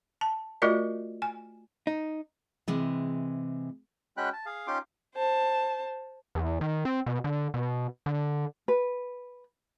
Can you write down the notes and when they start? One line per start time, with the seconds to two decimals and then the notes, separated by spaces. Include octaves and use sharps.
0.21 A5
0.62 A3 F4 F#4 A#4 D5 D#5
1.22 G#5
1.87 D#4
2.68 C3 E3 G#3
4.17 G#3 C#4 F#4 G5 B5 F#6
4.33 A5
4.46 G#4 F5
4.67 C#4 D#4 F4 G4 C6 D6
5.15 C5 A5
6.35 E2
6.61 D#3
6.85 C4
7.06 B2
7.24 D3
7.54 B2
8.06 D3
8.68 B4